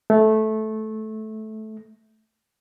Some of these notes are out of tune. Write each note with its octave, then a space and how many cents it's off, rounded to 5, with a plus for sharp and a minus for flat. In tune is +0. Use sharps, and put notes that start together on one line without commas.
A3 -15